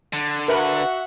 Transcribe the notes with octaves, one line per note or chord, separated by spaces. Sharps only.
D3
F#4 A#4 B4 E5 F#5